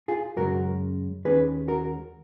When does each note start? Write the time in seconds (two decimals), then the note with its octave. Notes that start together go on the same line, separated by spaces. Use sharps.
0.08 F4 G#4
0.36 F#2 C#3 G#3 C#4 F#4 A#4
1.25 D#2 D#3 G#3 C#4 G#4 B4
1.68 F#4 A#4